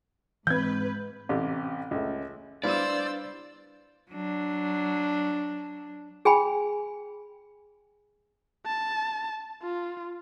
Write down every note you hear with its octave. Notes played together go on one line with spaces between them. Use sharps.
G#2 E3 C4 B4 G6 G#6
A1 C3 G4
C#2 A3
G3 D4 E4 B4 C5 D5 F5 E6
F#3 D4
G#4 G5 G#5 B5
A5
F4